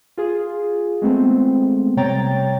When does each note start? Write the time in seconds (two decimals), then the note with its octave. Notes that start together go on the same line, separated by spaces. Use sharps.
0.18 F4 G#4
1.02 G#3 A3 B3 C4
1.97 C3 G3 C#5 G5 A#5 A6